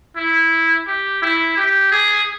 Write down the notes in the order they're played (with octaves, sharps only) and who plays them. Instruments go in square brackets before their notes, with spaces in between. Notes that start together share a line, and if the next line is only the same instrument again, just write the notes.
[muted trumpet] E4
G4
E4
G4
G#4